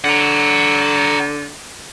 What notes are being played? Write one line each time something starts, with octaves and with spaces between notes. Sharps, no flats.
D3 F#5 A#5